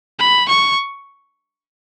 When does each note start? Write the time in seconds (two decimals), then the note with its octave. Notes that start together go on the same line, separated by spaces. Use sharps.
0.20 B5
0.49 C#6